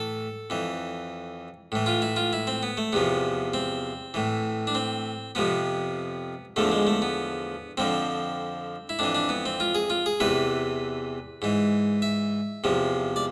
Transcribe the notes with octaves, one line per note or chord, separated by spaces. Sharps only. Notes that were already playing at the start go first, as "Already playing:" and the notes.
Already playing: A2 E3 A4
F2 E3
A2 E3
F4
E4
F4
E4
C4
B3
A3
E2 C3 F3 B3
C4
A2 E3
D4
C4
F2 C3 F3 B3
E2 D3 F3 A3
G#3
A3
B3
F2 D3 F3 C4
E4
F2 E3 D4
D4
B3
C4
F4
G#4
F4
G#4
E2 C3 E3 B4
G#2 E3
E5
E2 C3 F3
D5